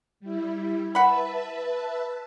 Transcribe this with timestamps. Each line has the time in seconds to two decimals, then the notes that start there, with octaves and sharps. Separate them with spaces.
0.20 G3 E4
0.95 B4 E5 F#5 A5 B5